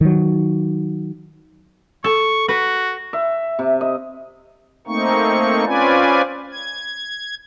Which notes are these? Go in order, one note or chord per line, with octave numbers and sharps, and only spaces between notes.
D#3 F#3
A4 C#6
F#4 B4
E5
C3
D#5
A3 A#3 C4 D#4 C#6
C4 C#4 F4 B4 D5 G#5
G#6